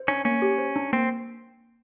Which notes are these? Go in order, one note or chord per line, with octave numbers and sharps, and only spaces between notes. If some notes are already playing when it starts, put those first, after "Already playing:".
Already playing: C5
C#4 D4
A#3 C#4
G4
C5
D4
A#3 C4